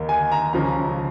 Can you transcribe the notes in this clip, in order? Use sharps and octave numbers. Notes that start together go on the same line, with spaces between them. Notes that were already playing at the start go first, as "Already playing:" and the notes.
Already playing: D#2 D#3
G#5
A#5
C#2 C#3 F3 A#5